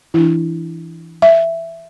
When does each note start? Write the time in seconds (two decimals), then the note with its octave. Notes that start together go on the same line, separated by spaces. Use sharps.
0.14 E3 D4 E4
1.22 E5